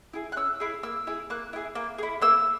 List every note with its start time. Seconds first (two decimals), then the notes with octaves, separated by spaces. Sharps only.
0.13 E4 G#4
0.32 F#6
0.36 C#4 E6
0.60 E4 G#4
0.83 A#3 E6
1.07 E4 G#4
1.30 A#3 F#6
1.53 E4 G#4
1.75 A#3
1.98 G#4
2.03 E4
2.22 A#3 E6